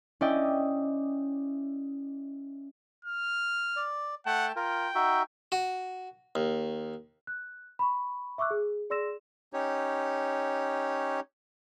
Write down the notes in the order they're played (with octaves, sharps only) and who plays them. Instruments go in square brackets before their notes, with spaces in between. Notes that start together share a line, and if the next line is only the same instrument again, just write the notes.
[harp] C#4 E4 D5 D#5 G5
[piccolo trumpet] F6
[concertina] D5
[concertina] A3 G5 A5 [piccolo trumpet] F#5
[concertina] F4 A#4 [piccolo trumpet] G5
[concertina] D#4 F#4 E5
[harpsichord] F#4
D#2
[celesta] F#6
B5 C#6
E5 C#6 D6 E6 F#6
G#4
G#4 D5 C6 E6 A#6 E7
[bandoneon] C#4 D#4 G4 C#5